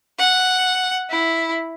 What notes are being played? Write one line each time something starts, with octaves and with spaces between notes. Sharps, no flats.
F#5
E4